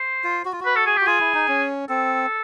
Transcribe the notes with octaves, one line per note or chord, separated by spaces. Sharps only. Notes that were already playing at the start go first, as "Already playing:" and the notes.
Already playing: C5
F4
F#4
F4
F#4
B4
A4
G#4
G4
F#4
F4 G#4
E4
D#4
C#4
C4 A4